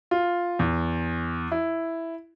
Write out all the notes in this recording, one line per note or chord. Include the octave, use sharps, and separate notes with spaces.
F4
E2
E4